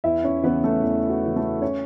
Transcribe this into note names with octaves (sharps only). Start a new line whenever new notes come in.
E2 E4 E5
C#4 C#5
C#3 E3 B3 B4
A3 A4
E2
F#4
C#3 E3
A3 A4
C#4 C#5